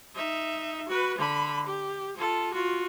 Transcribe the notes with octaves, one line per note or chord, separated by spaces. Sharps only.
D#4 E5
F#4 B4
D3 B5
G4
F4 A4
F4 F#4